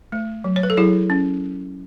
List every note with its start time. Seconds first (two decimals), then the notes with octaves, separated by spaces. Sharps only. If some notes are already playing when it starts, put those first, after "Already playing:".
0.12 A3
0.44 F#3
0.56 C#5
0.63 B4
0.70 A4
0.77 F#3 E4 G#4
1.10 C#4